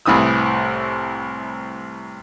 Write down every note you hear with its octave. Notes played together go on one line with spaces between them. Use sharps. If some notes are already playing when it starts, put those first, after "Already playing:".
C2 A2 E3 D#6 E6